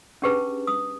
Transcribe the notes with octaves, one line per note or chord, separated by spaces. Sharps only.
C#4 D4 G4 G#4 B4 A5
D#6